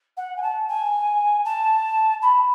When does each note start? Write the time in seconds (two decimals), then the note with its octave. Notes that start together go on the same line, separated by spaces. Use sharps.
0.16 F#5
0.36 G#5
0.42 A5
0.68 G#5
1.44 A5
2.22 B5